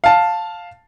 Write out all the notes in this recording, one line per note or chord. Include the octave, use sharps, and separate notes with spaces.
F5 A5